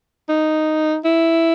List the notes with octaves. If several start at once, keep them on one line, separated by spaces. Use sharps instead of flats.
D#4
E4